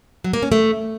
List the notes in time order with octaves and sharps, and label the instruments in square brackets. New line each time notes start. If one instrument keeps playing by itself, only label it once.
[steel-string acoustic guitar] F#3
A#3
C#4
A3